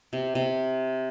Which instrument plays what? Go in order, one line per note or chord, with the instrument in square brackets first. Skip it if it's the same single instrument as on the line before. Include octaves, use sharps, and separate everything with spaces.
[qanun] C3
C3